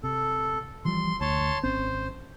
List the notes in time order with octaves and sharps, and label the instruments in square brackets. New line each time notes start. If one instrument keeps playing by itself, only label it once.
[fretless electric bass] C3 [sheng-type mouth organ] A4
[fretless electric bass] E3 F3 G3 [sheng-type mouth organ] C6
[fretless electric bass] D2 [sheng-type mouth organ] C#5 A5 C6
[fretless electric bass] G#1 C4 C#4 [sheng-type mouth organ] C5